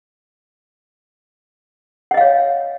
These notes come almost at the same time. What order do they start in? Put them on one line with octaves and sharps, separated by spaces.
F#5 D#5 F5 C#5